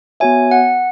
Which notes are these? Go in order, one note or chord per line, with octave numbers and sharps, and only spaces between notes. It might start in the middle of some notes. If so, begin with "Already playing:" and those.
B3 F#4 C#5 E5 G#5
F#5